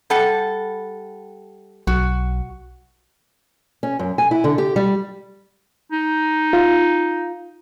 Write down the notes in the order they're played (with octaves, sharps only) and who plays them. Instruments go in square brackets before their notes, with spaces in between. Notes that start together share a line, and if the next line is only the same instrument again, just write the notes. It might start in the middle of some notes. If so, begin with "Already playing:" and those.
[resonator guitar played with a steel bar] G3 A4 F#5
[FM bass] B1 [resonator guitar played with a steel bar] F#4
[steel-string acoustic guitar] C#4
F#2
G#5
E4
D3
G4
G3
[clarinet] D#4
[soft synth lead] F4